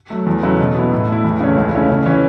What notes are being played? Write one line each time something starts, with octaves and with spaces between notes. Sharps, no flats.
F#3 A3
E2
C#3 F#3 A3 E4
B2
B3 E4
A2
A3 E4
E2
C#3 A3 C#4
C#2
C#3 A3 C#4 E4
C#3
E3 C#4